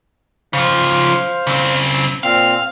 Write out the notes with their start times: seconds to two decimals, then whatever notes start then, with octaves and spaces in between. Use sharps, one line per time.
0.53 C#3 F3 C5 F5 F6
1.47 C#3 C4
2.23 A#2 C4 F5